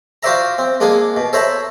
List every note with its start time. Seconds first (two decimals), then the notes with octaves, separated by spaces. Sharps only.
0.23 F4 F#4 C5 D5 E5 A#5
0.58 C4
0.80 G#3 A#3 D4 G#4
1.17 B2
1.33 A4 C5 C#5 E5 A#5 B5